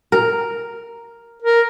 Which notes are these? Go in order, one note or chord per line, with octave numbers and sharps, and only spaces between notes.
A#4
A#4